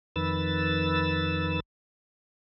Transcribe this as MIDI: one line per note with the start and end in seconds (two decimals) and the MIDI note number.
0.16 1.60 41
0.16 1.60 51
0.16 1.60 71
0.16 1.60 88
0.16 1.60 93